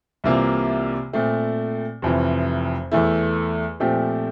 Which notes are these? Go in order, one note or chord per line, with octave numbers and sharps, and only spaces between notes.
C2 C3 E3 A#3 F4
A#2 A3 C4
F1 F2 E3
E2 E3 A3 E4
A#2 F3 A3 C4 G4